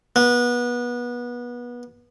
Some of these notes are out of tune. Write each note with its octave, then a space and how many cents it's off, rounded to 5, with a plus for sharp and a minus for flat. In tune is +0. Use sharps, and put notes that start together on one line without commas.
B3 -25